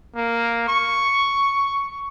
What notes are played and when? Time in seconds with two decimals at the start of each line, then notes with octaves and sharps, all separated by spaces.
0.16 A#3
0.68 C#6